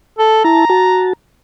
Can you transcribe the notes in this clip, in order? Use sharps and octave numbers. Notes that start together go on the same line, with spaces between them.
A4
E4 A5 A#5
F#4 A5